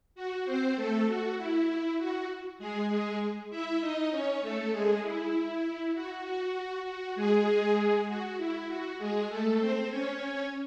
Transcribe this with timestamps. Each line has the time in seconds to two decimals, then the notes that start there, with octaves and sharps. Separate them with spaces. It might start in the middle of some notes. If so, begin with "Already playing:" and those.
0.15 F#4
0.45 C4 C5
0.76 A3 A4
1.07 F#4
1.37 E4
1.98 F#4
2.59 G#3 G#4
2.89 G#3 G#4
3.50 E4 E5
3.80 D#4 D#5
4.11 C#4 C#5
4.42 A3 A4
4.72 G#3 G#4
5.02 E4
5.94 F#4
6.24 F#4
6.85 F#4
7.16 G#3 G#4
8.07 F#4
8.38 E4
8.68 F#4
8.99 G#3 G#4
9.29 A3 A4
9.59 C4 C5
9.90 C#4 C#5